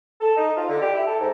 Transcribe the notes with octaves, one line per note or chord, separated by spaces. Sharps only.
A4
D#4
F4
D3
G4
E4
A4
G#2